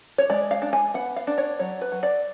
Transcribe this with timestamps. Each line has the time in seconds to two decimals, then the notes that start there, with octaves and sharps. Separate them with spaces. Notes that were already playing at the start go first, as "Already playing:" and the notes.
0.18 C#5
0.30 G#3 D5
0.51 F5
0.62 D4
0.73 G#5
0.94 B3 F#5
1.16 F5
1.27 D4
1.38 C#5
1.59 F#3 C#5
1.81 B4
1.92 F#3
2.03 D5